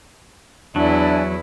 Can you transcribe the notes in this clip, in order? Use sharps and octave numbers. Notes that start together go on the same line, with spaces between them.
E2 F#3 D4 E4 D5 G#5